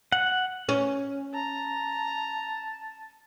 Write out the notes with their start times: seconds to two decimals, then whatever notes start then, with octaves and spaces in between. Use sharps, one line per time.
0.12 F#5
0.69 C#4
1.34 A5 A#5